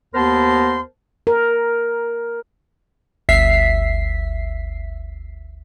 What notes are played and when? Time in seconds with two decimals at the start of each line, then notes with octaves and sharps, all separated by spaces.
0.14 D#2 B3 A#4 C5 A5 C6
1.27 A#4
3.29 G1 D2 E5 B6 C7